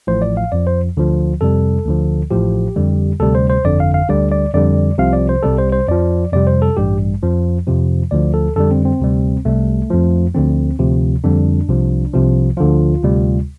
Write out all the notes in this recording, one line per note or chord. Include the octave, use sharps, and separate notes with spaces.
A1 A2 F3 C5
D5
F5
F2 F3 D5
C5
D2 D3 F3
F2 C3 G3 A4
D2 D3 F3
A1 A2 F3 G4
F2 D3 G3
D2 C3 G3 A4
C5
C5
G1 F2 D3 D5
F5
F5
D2 D3 G3 D5
D5
F2 D3 G3 D5
C2 C3 F3 F5
D5
C5
C2 C3 G3 A4
C5
C5
F2 F3 D5
F2 C3 G3 D5
C5
A4
A1 G2 G3 G4
F2 F3
F2 C3 F3
D2 D3 F3 D5
A4
F2 D3 G3 A4
C4
C4
D2 C3 G3
C2 C3 G3 A3
F2 F3
D2 D3 F3 C4
D2 C3 F3
F2 D3 G3 D4
C2 C3 F3
C2 C3 F3
D2 D3 F3 F4
D2 C3 G3